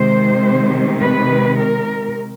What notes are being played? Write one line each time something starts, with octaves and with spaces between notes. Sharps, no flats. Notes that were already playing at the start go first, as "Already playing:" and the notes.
Already playing: C3 D#3 G#3 C5
B4
A#4